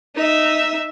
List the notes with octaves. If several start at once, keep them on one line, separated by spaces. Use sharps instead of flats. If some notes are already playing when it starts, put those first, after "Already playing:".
D#4 E5